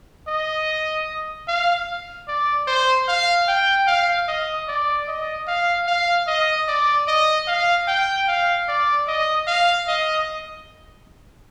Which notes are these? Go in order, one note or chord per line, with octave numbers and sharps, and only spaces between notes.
D#5
F5
D5
C5
F5
G5
F5
D#5
D5
D#5
F5
F5
D#5
D5
D#5
F5
G5
F5
D5
D#5
F5
D#5